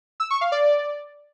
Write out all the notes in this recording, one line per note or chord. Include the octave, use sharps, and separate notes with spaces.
E6
C#6
F5
D5